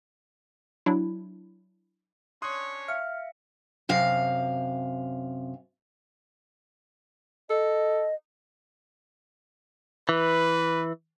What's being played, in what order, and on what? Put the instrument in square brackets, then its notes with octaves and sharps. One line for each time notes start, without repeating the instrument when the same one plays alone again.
[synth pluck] F#3 D4 E4
[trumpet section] C#4 D4 C#5 [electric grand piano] C6 D#6 F#6
[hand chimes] E5 F5 [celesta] F6 [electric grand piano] C#7
[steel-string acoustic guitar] F#2 C3 F5
[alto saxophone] A4 [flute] D#5
[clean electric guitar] E3 [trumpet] B4